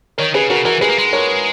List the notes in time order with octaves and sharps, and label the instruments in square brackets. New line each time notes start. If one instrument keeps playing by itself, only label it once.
[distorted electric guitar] D#3 [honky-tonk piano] A#4 C#5
[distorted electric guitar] C#3 [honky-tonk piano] G#4 B4
[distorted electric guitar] C#3 [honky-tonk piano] F#4 A#4
[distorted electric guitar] E3 [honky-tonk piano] F#4 A#4
[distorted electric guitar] G#3 [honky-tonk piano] G#4 B4
[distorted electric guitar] A#3
G#3
[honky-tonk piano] A#4 C#5